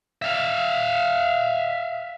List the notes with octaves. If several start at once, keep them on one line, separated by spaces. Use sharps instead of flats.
E5 F5